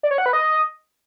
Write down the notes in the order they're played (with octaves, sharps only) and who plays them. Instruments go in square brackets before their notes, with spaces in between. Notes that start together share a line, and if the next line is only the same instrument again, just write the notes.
[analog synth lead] D5
C#5
F#5
B4
D#5